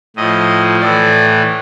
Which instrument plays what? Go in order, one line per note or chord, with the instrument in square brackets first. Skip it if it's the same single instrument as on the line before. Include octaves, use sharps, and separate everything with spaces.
[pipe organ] A2 F3 D#5
A2 E3 D5